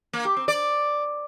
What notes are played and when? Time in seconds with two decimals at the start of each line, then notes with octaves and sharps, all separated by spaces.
0.13 A#3
0.25 G4
0.36 C4
0.48 D5